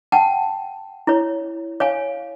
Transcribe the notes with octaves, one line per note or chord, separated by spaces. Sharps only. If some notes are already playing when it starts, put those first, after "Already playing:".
F#5 G5 A5
E4 C#5
C#5 F5 G#5